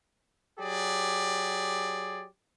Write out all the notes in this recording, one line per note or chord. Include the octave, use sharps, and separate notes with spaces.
F#3 G4 G#4 D5